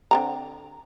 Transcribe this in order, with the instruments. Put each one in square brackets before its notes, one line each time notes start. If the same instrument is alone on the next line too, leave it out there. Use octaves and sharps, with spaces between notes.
[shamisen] D3 C4 A#5